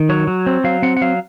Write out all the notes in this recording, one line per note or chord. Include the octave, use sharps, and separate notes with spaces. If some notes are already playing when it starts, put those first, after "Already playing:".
Already playing: D#3
F#3 C#5
F#3
C4
F#3 F5
C4 F#5
F#5
F#3 F5